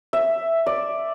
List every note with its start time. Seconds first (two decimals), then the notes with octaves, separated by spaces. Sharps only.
0.13 E5
0.66 D5